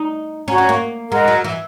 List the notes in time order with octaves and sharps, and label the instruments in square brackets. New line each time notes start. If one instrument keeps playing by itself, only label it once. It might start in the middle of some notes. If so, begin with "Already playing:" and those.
Already playing: [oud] D#4
[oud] C#4 [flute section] F#4 C#5 F#5 A#5
[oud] C#4
A#3
[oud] G#3 [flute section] A#4 D#5 F#5 A#5
[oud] F#3
E3